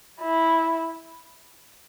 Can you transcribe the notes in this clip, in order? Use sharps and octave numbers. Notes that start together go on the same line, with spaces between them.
E4